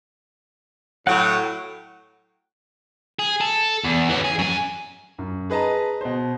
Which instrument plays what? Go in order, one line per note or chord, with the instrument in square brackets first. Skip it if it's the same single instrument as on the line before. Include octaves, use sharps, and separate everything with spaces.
[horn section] A2 F#3 [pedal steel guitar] F#5 G5 C#6
[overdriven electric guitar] G#4
A4
E2
E3 C#4
G#4
F#2 G#5
[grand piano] F#2
G#4 B4 D#5 A5 A#5
B2 C5